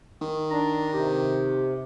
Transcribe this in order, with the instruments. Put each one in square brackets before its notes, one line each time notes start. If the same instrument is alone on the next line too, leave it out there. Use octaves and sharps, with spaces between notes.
[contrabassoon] D#3
[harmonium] D4 [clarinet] A#5
[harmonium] C3 [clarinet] G4